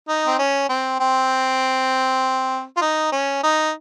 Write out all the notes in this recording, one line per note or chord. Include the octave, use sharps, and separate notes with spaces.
D#4
C4
C#4
C4
C4
F4
D#4
C#4
D#4